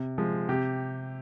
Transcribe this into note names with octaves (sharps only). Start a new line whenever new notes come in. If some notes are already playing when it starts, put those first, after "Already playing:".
Already playing: C3
F3 G#3
C3 G4